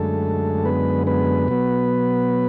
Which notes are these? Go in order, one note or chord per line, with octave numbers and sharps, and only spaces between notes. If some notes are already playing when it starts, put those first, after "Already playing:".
Already playing: F#2 D3 G#3 A3 A4
B3 B4
B3 B4
B2 F#3 B3